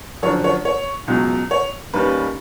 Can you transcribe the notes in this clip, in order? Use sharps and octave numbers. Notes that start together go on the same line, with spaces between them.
F#2 D3 F3 C#5
C#5
C#5
C#2 B2 F#3
C#5
D#2 D#3 G3 A#3 C#4 B4